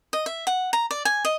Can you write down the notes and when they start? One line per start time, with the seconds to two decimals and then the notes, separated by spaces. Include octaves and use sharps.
0.13 D#5
0.26 E5
0.47 F#5
0.73 A#5
0.91 D5
1.05 G#5
1.25 D#5